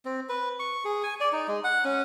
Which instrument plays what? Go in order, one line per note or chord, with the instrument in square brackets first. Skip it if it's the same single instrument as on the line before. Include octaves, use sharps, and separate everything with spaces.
[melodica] C4
B4
C#6
G#4
G#5
D5
D#4
G#3
F#5
C#4